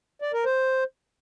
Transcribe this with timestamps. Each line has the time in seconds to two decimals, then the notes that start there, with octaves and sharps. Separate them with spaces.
0.22 D5
0.33 A#4
0.45 C5